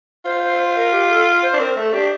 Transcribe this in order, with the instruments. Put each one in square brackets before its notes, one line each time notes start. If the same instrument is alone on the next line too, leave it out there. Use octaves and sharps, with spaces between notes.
[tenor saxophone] F4 [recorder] C5
[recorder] C5
C5
A#4
G4
A4
C5
[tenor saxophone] D4
[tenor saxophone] C4 [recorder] A#4
[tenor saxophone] A3 [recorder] A4
[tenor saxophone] D4 [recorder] G4